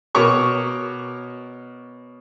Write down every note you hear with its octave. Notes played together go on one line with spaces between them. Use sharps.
B2 A#4 C#5 C#6 D6